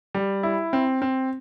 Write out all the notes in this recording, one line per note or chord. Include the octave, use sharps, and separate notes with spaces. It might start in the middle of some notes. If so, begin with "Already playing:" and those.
G3
E4
C4
C4